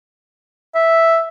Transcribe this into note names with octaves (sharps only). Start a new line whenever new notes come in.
E5